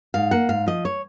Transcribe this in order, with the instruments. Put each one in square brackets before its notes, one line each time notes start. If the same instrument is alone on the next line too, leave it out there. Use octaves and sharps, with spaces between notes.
[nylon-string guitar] G#2 F5
A#3 F#5
G#2 F5
F3 D#5
C#5